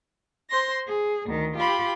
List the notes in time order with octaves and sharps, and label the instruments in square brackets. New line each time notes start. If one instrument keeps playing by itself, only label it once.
[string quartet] C5 C6 A#6
G#4
D2 D#3
F4 G4 B5